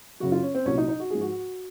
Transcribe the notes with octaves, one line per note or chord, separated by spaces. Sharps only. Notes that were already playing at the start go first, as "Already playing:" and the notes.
F#2 C#3 F#3 F#4
F4
C#4
C4
C2 A#2 F#3 C#4
D#4
D#4
F#4
G#2 F3 G#4
F#4